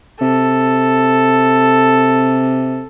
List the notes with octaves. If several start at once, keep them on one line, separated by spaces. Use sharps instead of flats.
C3 A4